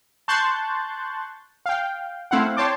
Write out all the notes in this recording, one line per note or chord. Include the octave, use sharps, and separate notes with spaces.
A5 C6 C#6 F#6 G6 A6
F5 G5
A3 C4 E4 F5 F#5
C#5 G5 A5 C6 D6